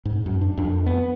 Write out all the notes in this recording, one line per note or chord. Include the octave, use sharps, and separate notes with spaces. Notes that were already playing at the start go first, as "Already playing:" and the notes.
G#2
F#2
D4
F2
B3